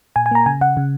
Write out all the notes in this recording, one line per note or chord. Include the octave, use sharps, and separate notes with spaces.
A#2 G#5
G#5
A#3 A#5
C#3 G#5
C#3 F#5
C#3